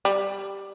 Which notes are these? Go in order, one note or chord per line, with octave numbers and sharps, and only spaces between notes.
G3